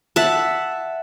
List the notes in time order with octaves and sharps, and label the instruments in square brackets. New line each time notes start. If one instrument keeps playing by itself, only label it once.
[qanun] E5 F#5 A5